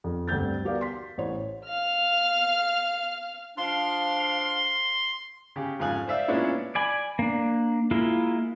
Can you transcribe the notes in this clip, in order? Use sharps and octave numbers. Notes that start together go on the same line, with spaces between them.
F2
D2 G2 C4 G6 A6
B3 F#4 G4 A#4 D5 F5
C6 B6
A1 C5 C#5
F5 F6
F3 D4 F5 C6
C#3 G4
F2 G#2 C#3 F5 G#5 F#6
C5 D5 E5 F5 E6
A#2 G#3 B3 C#4 D4 E4
D5 G#5 B5
A#3 D4
G#3 A#3 E4 F4